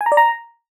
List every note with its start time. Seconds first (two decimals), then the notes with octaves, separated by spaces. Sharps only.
0.01 G#5
0.06 A#5
0.12 D5
0.17 A#5